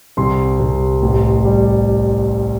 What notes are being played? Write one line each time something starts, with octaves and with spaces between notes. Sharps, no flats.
C2 C6
C2
A1
G3